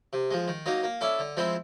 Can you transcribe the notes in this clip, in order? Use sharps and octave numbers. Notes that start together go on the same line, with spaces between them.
C3
F3 G#3
D#3
F#3 A#3 D#4
A#3
C#4 E4 A4 D5
D3
F3 G#3 C4 E4